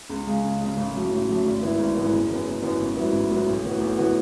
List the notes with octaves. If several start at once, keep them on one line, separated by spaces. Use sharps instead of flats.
C#2
C#3 G#3
C#2
C#3 G#3
A1
A2 F#3 A3
A1
A2 F#3 A3
G#1
G#2 E3 B3 E4
G#1
G#2 E3 B3 E4
F#1
F#2 E3 B3
F#1
F#2 E3 B3
A1
G#2 F#3 B3 E4
A1
G#2 F#3 B3 E4
B1
A2 E3 B3 F#4
B1
A2 E3 B3 F#4